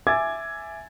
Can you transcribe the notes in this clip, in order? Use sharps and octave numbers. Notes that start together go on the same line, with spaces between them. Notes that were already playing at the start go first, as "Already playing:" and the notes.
E5 G#5 D6 E6 G#6 A6